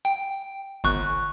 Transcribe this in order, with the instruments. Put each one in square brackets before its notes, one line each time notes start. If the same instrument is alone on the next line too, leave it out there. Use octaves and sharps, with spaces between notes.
[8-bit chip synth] G5
G1 C#6 F#6